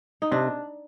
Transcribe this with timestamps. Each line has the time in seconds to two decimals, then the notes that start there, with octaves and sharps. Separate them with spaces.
0.22 D#4
0.32 C3 D4